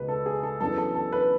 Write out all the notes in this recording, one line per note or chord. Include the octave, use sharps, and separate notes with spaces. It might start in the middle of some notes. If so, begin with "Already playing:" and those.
Already playing: C#2 B2 G#3 B4
A4
G#4
A4
F#2 E3 B3 D4 A4
A4
A4
B4